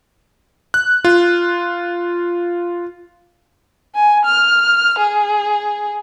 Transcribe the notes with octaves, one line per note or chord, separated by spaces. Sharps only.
F#6
F4
G#5
F6
G#4